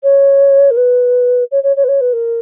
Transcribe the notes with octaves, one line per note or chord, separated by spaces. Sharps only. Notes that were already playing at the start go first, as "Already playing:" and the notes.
C#5
A#4
B4
C#5
C#5
C#5
B4
C#5
B4
A#4